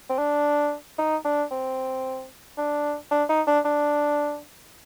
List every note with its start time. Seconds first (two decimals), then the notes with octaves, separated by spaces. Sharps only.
0.10 C4
0.18 D4
0.98 D#4
1.25 D4
1.51 C4
2.58 D4
3.11 D4
3.29 D#4
3.47 D4
3.65 D4